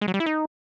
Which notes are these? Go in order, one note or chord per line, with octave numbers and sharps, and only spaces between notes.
G#3
F#3
G3
E4
D#4